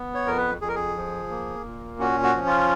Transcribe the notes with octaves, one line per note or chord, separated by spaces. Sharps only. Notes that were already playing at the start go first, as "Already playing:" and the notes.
Already playing: B3
C#5
F2 A#4
B4
F2 G#4
A#4
G#4
F3
A#3
A#2
C#4 F#4
F#4
F3
F4